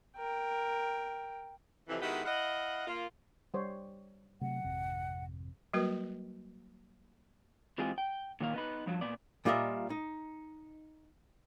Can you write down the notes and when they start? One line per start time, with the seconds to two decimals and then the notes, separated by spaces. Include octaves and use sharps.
0.17 A#4 G5
1.88 F2 C3 E3
2.01 D#3 G#3 B3 E4 F#4 G4
2.25 E4 D#5 F5 F#5
2.87 A#3 F4
3.54 G3 C5 C#5
4.41 C3 F#3 A3 F#5
4.64 G#1 F2 C3
5.73 F#3 G3 A#3 F#4 A#4 B4
7.78 E3 G#3 C4 F4 G4 G#4
7.98 G5
8.40 A#2 D#3 F#3 A#3 F5
8.54 B3 D#4 B4
8.86 G2 F3 F#3
9.01 A#2 B3 D5
9.45 A#2 G3 F4 A#4 D#5 E5
9.90 D#4